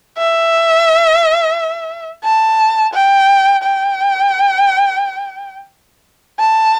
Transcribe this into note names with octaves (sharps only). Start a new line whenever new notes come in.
E5
A5
G5
G5
A5